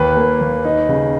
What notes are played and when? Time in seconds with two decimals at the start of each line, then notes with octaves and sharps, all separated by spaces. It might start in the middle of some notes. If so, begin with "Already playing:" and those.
Already playing: D#2 B4
0.17 A#3
0.41 D#2
0.65 D#4
0.89 C#3